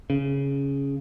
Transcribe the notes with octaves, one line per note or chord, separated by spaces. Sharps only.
C#3